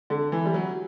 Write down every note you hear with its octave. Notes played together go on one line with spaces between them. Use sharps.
D3
E3
G3
F#3